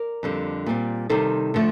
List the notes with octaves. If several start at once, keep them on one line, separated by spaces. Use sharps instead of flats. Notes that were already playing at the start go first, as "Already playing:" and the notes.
Already playing: A#4 D5
F2 D3 G3 C4
A#2 G3 C4
C3 D#3 G3 A4 C5
D3 F3 A3